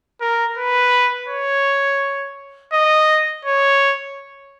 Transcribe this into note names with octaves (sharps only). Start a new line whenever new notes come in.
A#4
B4
C#5
D#5
C#5